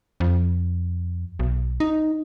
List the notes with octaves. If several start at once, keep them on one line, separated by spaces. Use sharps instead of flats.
F2
B1
D#4